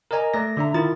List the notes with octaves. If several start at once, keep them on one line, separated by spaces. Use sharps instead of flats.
A#4 D5 D#5 G#5 A#5
A3 D5 A#6
D3 D4 E5 A#5
D#3 E4 F4 A6